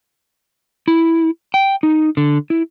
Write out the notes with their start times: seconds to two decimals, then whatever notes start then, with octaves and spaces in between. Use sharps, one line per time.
0.88 E4
1.54 G5
1.83 D#4
2.17 D3
2.50 E4